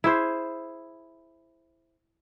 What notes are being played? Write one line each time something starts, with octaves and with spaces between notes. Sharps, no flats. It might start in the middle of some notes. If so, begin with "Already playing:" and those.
E4 G#4 C5